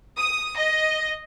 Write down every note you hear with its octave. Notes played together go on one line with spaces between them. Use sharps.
D#6
D#5